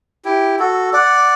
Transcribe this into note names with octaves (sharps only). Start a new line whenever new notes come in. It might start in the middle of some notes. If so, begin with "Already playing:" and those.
E4 G4
F#4 A4
D5 F#5